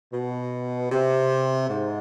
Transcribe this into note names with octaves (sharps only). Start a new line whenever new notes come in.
B2
C3
G#2